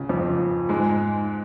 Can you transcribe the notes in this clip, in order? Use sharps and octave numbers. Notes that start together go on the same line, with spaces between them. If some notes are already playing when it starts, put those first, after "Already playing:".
Already playing: C#2 C#3
F2 F3
G#2 G#3